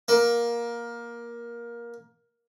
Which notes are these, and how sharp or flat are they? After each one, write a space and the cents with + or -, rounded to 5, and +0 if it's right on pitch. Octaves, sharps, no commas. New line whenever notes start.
A#3 +15